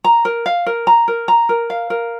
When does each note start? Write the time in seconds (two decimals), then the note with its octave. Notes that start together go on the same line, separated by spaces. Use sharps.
0.04 A#5
0.25 A#4
0.46 F5
0.66 A#4
0.87 A#5
1.08 A#4
1.28 A#5
1.49 A#4
1.70 F5
1.90 A#4